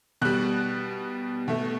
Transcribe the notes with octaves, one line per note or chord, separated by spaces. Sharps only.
B2 G3 F#6
B2 A3